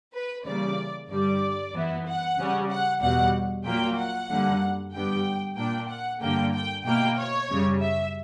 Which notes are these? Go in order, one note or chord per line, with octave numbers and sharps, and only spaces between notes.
B4
C#3 E3 G3 A#3 D5
G2 D3 G3 D5
F#2 E3 B3 E4
F#5
C#3 G3 C#4
F#5
E2 B2 G3 F#5
A#2 F#3 A#3 G5
F#5
F#2 D3 G3 A#3
G2 D3 G3 B3 G5
A#2 A#3 D4 G5
F#5
G2 D3 A#3 G5
G5
B2 A#3 E4 G5
C#5
F#2 C#3 G3
E5